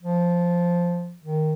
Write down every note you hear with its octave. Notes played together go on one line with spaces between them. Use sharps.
F3
D#3